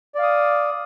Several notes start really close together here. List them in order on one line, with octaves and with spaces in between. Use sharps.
D5 F5 D#6